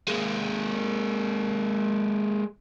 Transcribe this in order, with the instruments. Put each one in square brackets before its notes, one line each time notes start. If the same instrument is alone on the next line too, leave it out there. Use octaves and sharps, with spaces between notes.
[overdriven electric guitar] G#3 A#3